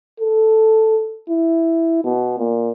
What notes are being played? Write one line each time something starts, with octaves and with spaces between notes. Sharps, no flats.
A4
E4
B2
A#2